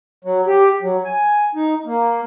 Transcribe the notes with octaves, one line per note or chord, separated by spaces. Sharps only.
F#3
G4
F#3
G#5
D#4
A#3